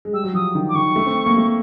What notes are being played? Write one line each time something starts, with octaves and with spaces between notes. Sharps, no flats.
G#3
G3 E6
F#3
F3 D#6
D#3
D6
D#3 C#6
A3
C4
A#3
A3